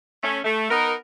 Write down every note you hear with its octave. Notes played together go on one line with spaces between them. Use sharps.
A3 C#4
A3
B3 D#4 A#4